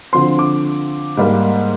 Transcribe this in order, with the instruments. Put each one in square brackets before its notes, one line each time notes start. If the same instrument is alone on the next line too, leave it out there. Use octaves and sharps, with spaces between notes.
[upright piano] D3 F3 C4 C6
D6
G#2 G3 A#3